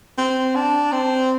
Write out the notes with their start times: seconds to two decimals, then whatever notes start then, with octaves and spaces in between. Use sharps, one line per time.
0.18 C4
0.55 D4
0.92 C4